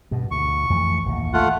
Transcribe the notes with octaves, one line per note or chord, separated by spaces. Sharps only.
G2 B2
D2 C#6
F2 E3 A3
A1 D#2 A2
A3 F4 F#5